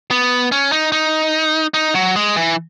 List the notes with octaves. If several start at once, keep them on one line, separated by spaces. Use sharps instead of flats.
B3
C#4
D#4
D#4
D#4
F#3
G#3
E3